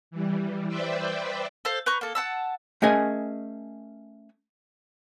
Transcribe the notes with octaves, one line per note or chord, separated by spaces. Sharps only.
E3 G3
B4 C5 D5 E5 G5
A4 C5 F5
B4 A#5 C#6 G6
A#3 A4
F#5 A5 E6
A3 C#4 G#4 A#4 D#5 G#5